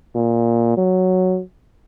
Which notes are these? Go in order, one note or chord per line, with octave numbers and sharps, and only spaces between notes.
A#2
F#3